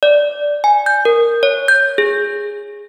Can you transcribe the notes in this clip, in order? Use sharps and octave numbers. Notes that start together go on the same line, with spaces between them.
D5
G#5
G6
A#4
C#5
G6
G#4